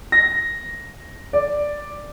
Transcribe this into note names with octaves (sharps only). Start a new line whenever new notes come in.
A#6
D5